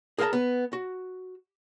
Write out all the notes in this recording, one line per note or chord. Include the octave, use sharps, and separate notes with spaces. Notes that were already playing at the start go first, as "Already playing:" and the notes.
G#4 A#4 B4 F5 A5 A#5
B3
F#4